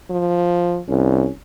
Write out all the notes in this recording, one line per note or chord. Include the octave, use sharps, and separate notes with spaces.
F3
C2 C#4